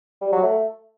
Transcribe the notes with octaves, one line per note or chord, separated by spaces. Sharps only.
G3
F#3
A3